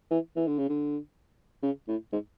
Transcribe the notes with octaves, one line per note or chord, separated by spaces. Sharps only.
E3
E3
D3
C#3
D3
C#3
A2
G#2